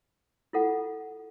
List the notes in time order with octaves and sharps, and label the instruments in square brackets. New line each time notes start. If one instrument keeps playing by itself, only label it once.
[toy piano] E4 F4 A4 F#5